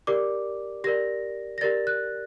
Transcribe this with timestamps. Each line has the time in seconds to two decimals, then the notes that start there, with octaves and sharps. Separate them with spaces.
0.07 G4 A#4 D5 D6
0.84 G4 A#4 D5 A#6
1.58 A#6
1.61 G4 A#4 D5 A6
1.87 F#6